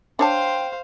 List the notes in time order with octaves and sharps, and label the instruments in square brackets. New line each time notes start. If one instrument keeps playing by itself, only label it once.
[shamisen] D4 C#5 A5 [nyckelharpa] C5 F5 [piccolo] G5